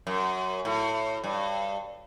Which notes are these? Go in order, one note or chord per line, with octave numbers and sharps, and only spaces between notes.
F#2
A2
G2